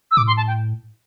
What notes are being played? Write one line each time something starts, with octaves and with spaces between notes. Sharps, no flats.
E6
A2 D6
C6
A5
G5